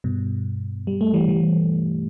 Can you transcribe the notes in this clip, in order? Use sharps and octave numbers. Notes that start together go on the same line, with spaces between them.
G2 B2
G3
A3
E3 G3
E3 G3